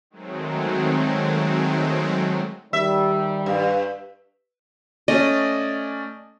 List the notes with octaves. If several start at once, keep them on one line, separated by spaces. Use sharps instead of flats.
D#3 F#3 G#3 A3 C4
D#3 G3 E5
G2
A3 C#4 D5 D#5